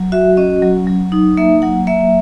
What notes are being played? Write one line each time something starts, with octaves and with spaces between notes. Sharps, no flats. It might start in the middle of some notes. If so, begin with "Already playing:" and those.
Already playing: F#3
F#4 E5
C#4 D#5
F#3
F#3
D#4
A#3 E5
F#3 F#5
A#3 E5